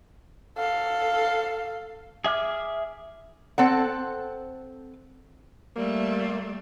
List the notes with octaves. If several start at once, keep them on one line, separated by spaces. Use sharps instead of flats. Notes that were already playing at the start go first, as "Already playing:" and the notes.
A4 F5
G#4 E5 D6 F6
C4 A4 F#5
G3 A3 A#3